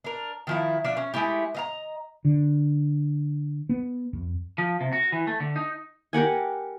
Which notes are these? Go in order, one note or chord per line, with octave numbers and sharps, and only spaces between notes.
D4 A#4
D#3 F3 E4
F3 D4 D5 E5
C#4
G#3 A3 E4 G4
D#5 F5 A#5
D3
B3
F2
F3
C3
F#4
E3
A3
D3
D#4
G4 A#4 F#5 G#5